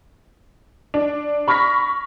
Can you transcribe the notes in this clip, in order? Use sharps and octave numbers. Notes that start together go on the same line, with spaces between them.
D4
B5 C#6 F6 A#6 B6